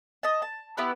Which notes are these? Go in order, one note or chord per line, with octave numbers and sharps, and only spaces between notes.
D#5 A5
A5
B3 E4 G4 B4